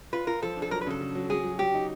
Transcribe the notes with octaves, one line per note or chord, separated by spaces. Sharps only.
F4 B4
F4 A#4
F3 A4
D4
A4
F#3 A#4
B4
C#3 A4
C#3
F#3
F#3 G#4
F#3
F#3 G4
D#4